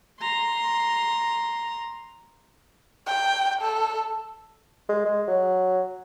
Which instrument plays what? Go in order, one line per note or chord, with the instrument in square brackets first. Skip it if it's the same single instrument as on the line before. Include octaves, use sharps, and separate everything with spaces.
[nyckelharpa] A#5 C6
[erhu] G5
A4
[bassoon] G#3
G#3
F#3